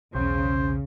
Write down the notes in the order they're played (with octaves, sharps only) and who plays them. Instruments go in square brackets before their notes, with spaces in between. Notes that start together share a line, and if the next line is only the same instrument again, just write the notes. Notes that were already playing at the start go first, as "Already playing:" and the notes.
[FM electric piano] B1 E2 [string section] C#3 [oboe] C5